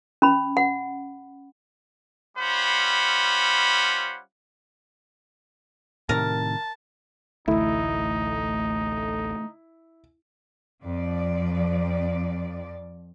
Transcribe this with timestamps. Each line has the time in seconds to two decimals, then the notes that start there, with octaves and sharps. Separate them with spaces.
0.22 C#4 B5
0.57 F#5
2.37 G3 C#4 F4 C5 F#5 B5
6.09 A2 C3 D#3 A#4 A5
7.48 A1 D2 A3 D#4 E4
10.85 F2 F3 D5